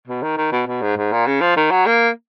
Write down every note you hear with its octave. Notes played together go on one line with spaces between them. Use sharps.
B2
D#3
D#3
B2
B2
G#2
G#2
A#2
C#3
F3
D#3
F#3
A#3